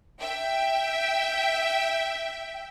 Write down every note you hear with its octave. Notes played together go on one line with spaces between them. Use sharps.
E5 G5